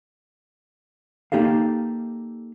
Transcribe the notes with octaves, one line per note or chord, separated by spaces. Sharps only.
A#3 D#4 G4 A4 F5